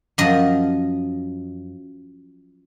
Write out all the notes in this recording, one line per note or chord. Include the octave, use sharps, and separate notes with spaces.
F#2 F3 D#5